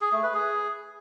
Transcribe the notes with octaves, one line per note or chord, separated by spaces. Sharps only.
G#4
A3
B4
G#4